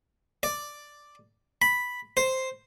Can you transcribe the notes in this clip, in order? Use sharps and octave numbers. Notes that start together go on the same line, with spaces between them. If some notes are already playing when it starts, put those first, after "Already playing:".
D5
B5
C5